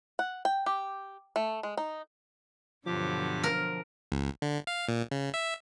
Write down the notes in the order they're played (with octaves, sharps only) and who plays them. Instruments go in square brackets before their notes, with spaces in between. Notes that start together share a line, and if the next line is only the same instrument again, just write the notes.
[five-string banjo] F#5
G5
G4
A3
G#3
D#4
[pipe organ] G2 G4 D6 [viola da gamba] B2 D3 F#3 [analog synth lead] F3
[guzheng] A#4
[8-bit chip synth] C#2
D3
F5
A#2
C#3
E5